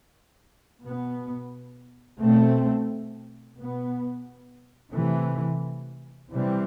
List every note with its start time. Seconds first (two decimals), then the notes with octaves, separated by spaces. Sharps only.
0.83 B2 B3
2.19 B2 A3 C4
3.57 B2 B3
4.93 C3 E3 A3
6.31 C3 E3 G3 C4